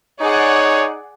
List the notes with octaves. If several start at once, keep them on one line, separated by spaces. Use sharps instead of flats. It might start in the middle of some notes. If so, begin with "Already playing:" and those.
D#4 G#4 C#5 D5 F#5